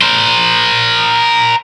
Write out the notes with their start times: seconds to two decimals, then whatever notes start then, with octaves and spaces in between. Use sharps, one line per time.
0.01 A#4 C5